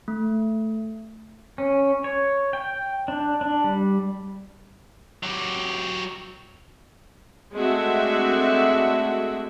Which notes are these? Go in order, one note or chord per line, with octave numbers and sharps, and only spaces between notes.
A3
C#4
C#5
G5
D4
D4
G3
F#3 G4
G#3 A3 C4 D4 F#4 E5